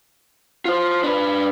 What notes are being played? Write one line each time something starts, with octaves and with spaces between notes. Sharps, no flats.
F4 C5
D4 B4